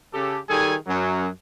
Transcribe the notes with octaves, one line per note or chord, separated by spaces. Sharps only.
C#3 G4 A4
D#3 G3 G#4 A4 G#5
F#2 F#3